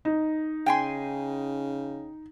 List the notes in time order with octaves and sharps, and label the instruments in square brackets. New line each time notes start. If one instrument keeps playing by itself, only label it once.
[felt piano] D#4
[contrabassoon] C#3 [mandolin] G5 G#5 C6